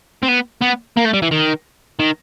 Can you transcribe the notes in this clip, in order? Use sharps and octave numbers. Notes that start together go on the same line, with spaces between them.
C4
B3
B3
A#3
A3
G3
E3
D#3
D#3